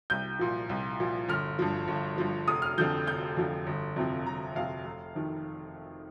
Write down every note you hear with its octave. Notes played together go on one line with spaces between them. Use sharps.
C2 G6
A#2 F3
C2
A#2 F3
G1 F6
G2 F3
G1
G2 F3
F1 D#6
F6
F2 D3 F3 G6
F1 G6
F2 D3 F3
G1
F2 C3 F3
G1 A#5
F2 C3 F3 F5
F1
F2 D#3